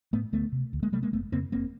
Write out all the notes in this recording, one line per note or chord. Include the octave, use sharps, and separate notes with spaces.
A2 A3 B3
D2 A3 B3
C3
D2
G#3 A#3
C3 G3 A3
G#3 A#3
F#1 A3 B3
F2 C#3 A#3 C4
F#1 A#3 C4